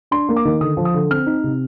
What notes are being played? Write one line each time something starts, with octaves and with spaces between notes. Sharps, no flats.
D4 C6
A#3
D6
D#3
D3 D#6
F3
D#6
D3
C4 F6
D#4
C3